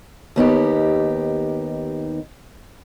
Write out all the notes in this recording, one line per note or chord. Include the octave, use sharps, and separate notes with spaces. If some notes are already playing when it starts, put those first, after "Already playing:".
D#2 B3 D#4 G4